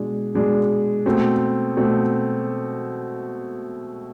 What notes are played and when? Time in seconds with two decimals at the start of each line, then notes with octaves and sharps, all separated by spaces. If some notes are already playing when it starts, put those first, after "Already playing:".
Already playing: B2 G#3 D4
0.34 B2 G#3 D4
1.06 B2 A3 C4
1.77 B2 A3 C4